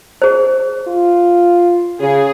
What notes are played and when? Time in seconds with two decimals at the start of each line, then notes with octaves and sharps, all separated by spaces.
0.22 G#4 C5
0.87 F4
2.00 C#3 G#4